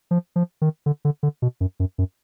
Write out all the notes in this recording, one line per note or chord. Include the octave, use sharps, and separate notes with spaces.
F3
F3
D#3
D3
D3
D3
B2
F#2
F#2
F#2